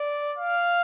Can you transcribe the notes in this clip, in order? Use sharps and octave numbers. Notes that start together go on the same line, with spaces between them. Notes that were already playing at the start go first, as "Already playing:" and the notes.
Already playing: D5
F5